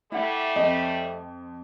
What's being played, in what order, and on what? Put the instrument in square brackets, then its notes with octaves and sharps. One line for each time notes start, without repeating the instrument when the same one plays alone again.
[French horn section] G3 A3 [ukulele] E4 F#5
[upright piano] F2 [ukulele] C5 D#5